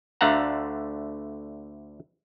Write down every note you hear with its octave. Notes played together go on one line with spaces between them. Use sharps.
D2 D3 A3 F5 F#5 A#5